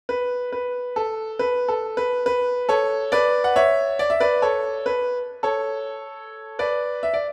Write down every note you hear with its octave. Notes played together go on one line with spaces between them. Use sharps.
B4
B4
A4
B4
A4
B4
B4
A4 C#5
B4 D5
F#5
C#5 E5
D5
E5
B4 D5
A4 C#5
B4
A4 C#5
B4 D5
E5
D5